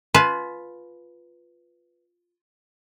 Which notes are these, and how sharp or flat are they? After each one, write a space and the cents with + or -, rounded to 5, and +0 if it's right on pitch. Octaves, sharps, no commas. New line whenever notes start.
F4 +5 B4 +0 G#5 +45